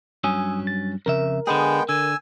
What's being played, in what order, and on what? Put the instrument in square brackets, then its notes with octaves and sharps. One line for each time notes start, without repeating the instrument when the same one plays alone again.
[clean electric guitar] G2 F#3 C#4 [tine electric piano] G#5 D#6 E6
[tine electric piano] A6
[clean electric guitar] F2 C#3 E5 [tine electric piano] A#4
[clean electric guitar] D3 G#4 [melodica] G#3 B3 G5
[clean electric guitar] D3 [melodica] G#5 E6